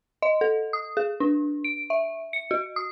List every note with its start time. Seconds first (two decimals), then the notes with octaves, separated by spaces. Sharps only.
0.22 D#5
0.41 A4
0.73 D#6
0.97 G#4
1.20 D4
1.64 D7
1.90 E5
2.33 C#7
2.51 F#4
2.76 D#6